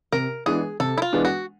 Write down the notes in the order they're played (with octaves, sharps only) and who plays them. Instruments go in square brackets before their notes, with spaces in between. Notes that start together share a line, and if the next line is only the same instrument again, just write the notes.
[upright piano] C3 [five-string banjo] A#4
[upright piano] E3 G#3 B3 D4 [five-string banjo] G#4
[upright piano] C3 [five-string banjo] A4
[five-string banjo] E4
F4
[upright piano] E3 G#3 B3 D4
[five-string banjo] F#4